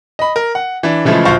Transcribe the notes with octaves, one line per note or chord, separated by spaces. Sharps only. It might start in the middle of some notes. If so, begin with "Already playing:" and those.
D#5 B5
A#4
F#5
E3 D4
C#3 E3 F3 G#3 A3
D1 A#1 F4 C5 F5 C#6